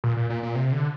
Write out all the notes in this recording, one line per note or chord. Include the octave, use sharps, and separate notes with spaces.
A#2
A#2
A#2
A#2
C3
D3